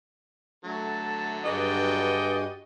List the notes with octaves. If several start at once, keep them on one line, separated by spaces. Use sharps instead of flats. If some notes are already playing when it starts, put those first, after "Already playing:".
D3 F#3 A3 A5
G2 F#4 G#4 B4 D5 D#5 G5